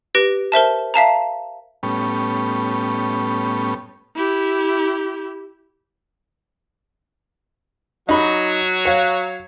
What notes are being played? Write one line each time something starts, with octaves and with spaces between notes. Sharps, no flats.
G4 B4 A#6 D7
A#4 C5 E5 A5
E5 F5 A5 A#5
A2 G3 B3 C#4
E4 G4
F#3 D#4 F#4 B5
C#5 F5